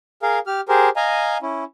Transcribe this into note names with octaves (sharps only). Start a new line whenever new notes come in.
G#4 A#4 F5
G4 F6
G4 G#4 A#4 C5
D#5 F5 G#5 A#5
C#4 E4